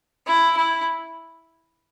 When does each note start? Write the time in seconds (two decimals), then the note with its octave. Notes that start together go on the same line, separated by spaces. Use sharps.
0.27 E4
0.57 E4